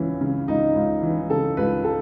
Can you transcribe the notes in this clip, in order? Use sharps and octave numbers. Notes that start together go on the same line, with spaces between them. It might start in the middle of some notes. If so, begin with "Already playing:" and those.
Already playing: C#2 C#3 E3 C#4
C#3
C#2 D#4
C#2
E3
C#3 A4
C#2 B4
A4